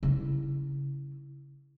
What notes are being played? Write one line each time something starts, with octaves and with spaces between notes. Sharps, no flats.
C#3 E4